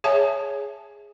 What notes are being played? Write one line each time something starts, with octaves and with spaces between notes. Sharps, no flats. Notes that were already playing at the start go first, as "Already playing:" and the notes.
G#4 C#5 E5 G#5 A5